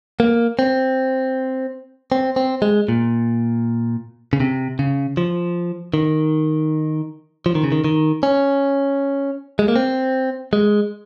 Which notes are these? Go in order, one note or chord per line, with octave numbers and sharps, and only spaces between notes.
A#3
C4
C4
C4
G#3
A#2
C#3
C3
C#3
F3
D#3
F3
D#3
C#3
D#3
D#3
C#4
G#3
A#3
C4
G#3